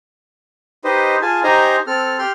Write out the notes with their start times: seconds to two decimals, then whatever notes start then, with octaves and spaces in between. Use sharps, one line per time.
0.84 D#4 G4 B4 C5 D#5
1.22 F4 G#4 G#5 A5
1.44 D#4 G4 C5 D#5 G#5 A#5
1.87 C4 A4 F6
2.19 G4 G5 C6 F6